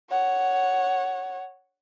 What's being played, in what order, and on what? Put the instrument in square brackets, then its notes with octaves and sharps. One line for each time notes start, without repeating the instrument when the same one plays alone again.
[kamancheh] C#5 F#5